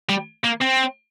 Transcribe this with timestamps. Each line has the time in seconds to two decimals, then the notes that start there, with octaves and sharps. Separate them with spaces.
0.09 G3
0.44 A#3
0.62 C4